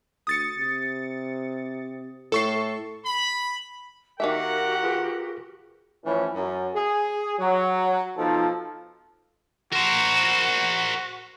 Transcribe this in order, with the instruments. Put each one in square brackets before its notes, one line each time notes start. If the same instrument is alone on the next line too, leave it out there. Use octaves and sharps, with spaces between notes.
[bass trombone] D2 [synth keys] D#6 A6 C#7
[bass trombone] C3
[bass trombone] A2 [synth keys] A4 C#6 C7
[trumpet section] B5
[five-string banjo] D#3 A#3 E5 [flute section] F#4 G4 A#4 [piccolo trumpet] F#5
[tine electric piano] F4 G#4 B4
[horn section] A2 E3 F3 C#4
F#2
G#4
F#3
B2 F3 D#4 F4 A4
[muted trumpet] F#4 [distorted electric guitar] A#4 C5